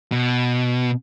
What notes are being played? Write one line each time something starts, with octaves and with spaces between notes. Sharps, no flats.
B2